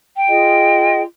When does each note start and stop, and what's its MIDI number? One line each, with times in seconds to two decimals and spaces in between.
0.17 1.01 79
0.28 1.02 65
0.28 1.02 68
0.28 1.02 75